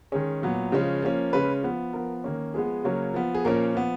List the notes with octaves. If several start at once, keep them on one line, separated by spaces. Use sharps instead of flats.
D#3 G#3 C#4 G#4
A#2 F#3 B3
C#3 F3 G#3 C#4
F3 A#3 C#4
C#3 G#3 C#4 B4
F3 B3
F3 B3 A#4
D#3 A#3 C#4
F3 G#3 B3 G#4
C#3 F#3 A#3 C#4
F3 B3
G#4
A#2 F3 A#3 C#4 A#4
F3 B3